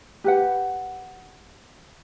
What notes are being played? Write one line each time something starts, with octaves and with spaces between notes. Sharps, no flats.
G4 B4 F#5